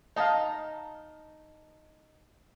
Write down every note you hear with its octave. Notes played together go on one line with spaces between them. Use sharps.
D#4 D#5 F5 A5 A#5